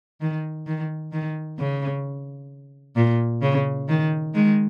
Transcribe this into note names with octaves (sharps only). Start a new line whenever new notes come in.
D#3
D#3
D#3
C#3
A#2
C#3
D#3
D#3 G#3